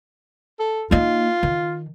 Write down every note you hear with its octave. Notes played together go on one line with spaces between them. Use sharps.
A4
A#3 D#4 F4
D#3